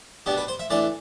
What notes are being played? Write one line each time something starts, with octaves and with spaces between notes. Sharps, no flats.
B2 B3 D4 G4
B4
C5
E5
E3 A3 D4 D5